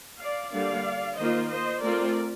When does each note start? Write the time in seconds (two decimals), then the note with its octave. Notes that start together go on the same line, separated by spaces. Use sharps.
0.20 D5 F5
0.53 D3 G3 A#3 D5 F5
1.17 D#3 A#3 F4 C5 D#5
1.49 C5 D#5
1.81 A3 C4 F4 A#4 D5